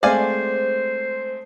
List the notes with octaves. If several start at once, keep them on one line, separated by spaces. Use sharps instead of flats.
G#3 A3 C4 C5 D5 F5 G#5